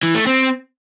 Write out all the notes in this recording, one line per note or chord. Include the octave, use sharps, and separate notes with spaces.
E3
A3
C4